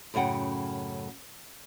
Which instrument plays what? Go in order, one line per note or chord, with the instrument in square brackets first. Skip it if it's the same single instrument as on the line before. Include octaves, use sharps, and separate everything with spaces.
[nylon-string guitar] F#2 A2 C#3 F#5 G5